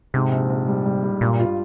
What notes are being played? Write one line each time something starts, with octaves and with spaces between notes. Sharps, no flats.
G#2 C3
A#1
A#1
G3
G3
G3
G2 A#2
F4